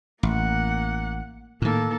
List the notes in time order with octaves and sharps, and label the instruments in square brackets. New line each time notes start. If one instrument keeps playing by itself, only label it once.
[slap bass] A1 [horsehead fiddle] A#3 F#5
[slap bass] A2 D#3 [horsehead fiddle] A#3 A4